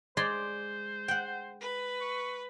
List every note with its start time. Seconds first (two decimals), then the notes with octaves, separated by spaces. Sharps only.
0.17 G#3 C5 D5 C6
1.08 F#5 G5
1.60 B4
2.00 C#6